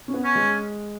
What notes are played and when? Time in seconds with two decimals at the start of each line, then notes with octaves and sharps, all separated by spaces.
0.08 C#4
0.14 B3
0.24 C#4
0.35 G#3